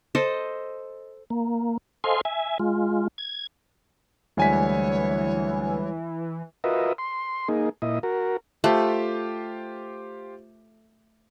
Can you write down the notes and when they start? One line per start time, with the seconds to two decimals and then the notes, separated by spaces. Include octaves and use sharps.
0.15 A4 C5 D#5
1.30 A#3
2.04 A4 C5 D#5 F5 G#5 C6
2.25 E5 G#5
2.60 G#3 F4
3.18 G#6
4.37 D2 E3 G3 G#3 C#5 G#5 B6
6.64 F4 F#4 A#4 B4 D#5 E5
6.98 C6
7.48 A#3 D#4 G#4
7.82 A#2 E4 D#5
8.03 F#4 A#4
8.64 A3 F4 G4 C5